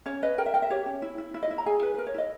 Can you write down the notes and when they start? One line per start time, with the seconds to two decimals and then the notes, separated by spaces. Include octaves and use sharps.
0.06 C#4 C#5
0.23 B4 D#5
0.38 A#4 G5
0.46 E5
0.54 A#4 G5
0.62 E5
0.70 G4 C#5
0.86 C#4
1.02 E4
1.18 E4
1.34 E4
1.43 D#5
1.51 E4
1.58 A#5
1.66 G#4 G#5
1.83 B4
1.94 A#4 B4
2.07 C#5
2.14 E4 D#5